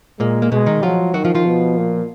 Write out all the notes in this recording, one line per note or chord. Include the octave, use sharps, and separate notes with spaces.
A#2 G#3 A#3
A#3
B2 G#3 B3
D#3 D#4
F3 F#3 F4
D#3 F#3 F#4
F3 F4
F3 F4
B2
A#2